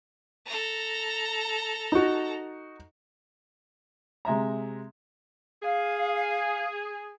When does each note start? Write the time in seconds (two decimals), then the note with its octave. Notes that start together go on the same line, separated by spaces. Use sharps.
0.46 A4 A#5
1.92 D#4 F#4
4.25 C3 G#3 E5 A#5
5.63 G#4 F5